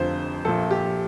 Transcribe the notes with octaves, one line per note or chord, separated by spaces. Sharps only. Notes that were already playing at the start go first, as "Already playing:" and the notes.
Already playing: F1 F2 D3 F3 C5
A#1 A#2 F3 A4
G4